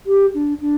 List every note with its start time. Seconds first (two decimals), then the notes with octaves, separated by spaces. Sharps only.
0.06 G4
0.34 D4
0.61 D4